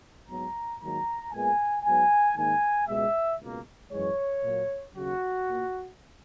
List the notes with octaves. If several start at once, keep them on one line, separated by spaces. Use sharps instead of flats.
G#2 F#3 B3 A#5
G#2 D#3 F#3 A#3 A#5
A#2 G#3 B3 G#5
G#2 F#3 B3 G#5
G#2 D#3 A#3 G#5
C#2 B2 G#3 E5
C#2 B2 A#3
F#2 E3 G#3 C#5
A#2 F#3 A#3
D#2 C#3 F#3 F#4
A#2 A#3